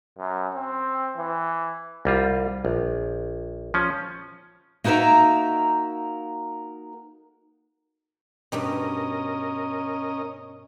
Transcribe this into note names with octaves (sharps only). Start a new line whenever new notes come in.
F#2
C4
E3
C2 G3 F4
A#1
F3 C#4
A#3 D#4 F#4 A#4 E5
G2 B2 G3 C#4 A#4 D#5